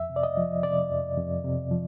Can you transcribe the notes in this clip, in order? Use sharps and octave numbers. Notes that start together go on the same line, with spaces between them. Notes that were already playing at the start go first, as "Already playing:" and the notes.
Already playing: F2 E5
C3
D5
D#5
F3
C3 D5
F2
F2
C3
F3